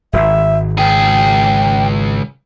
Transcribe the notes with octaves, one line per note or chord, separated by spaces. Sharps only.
D#1 G#1 E5
C#2 G#4 G5